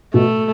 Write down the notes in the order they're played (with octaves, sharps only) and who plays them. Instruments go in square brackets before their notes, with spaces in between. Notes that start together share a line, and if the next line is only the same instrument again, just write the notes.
[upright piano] B2 [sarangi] A3